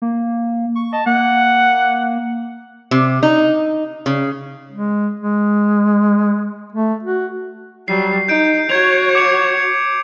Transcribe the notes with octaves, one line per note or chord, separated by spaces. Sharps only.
A#3
C#6
D#5 A5
A#3 F#5
C3
D#4
C#3
G#3
G#3
A3
F#4
F#3 G3 C7
D#4 G6 D7
F#4 C#5 G#6 F7
D6 C#7 F7